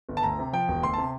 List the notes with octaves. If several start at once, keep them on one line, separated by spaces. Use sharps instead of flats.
G1
A5
D2 A#5
C3
F3 G5
E1
D2 C6
A5
C3